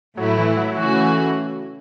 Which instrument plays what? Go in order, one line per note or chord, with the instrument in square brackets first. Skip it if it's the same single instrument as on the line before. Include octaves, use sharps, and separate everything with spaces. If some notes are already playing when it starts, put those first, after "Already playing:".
[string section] A2 A3 E4 [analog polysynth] F#3
[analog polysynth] E3
F#3
F#3
[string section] C#3 A3 C#4 F#4 [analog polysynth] E3